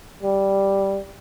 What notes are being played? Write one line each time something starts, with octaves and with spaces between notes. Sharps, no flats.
G3